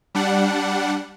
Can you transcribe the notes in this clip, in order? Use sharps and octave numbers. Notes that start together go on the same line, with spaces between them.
G3 D4 F#5